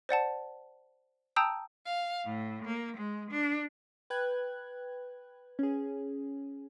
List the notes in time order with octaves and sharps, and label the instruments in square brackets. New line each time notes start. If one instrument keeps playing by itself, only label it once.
[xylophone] C5 D5 F#5 A5
G5 A5 A#5 D#6 E6 G6
[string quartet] F5
A2
A#3
G#3
D4
[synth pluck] B4 G5 F#6 G#6
C#4 G#4